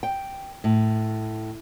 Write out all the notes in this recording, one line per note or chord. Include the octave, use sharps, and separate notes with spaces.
G5
A2